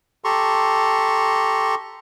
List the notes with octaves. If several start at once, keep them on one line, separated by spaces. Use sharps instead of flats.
G4 A4 A#5 C6 C#6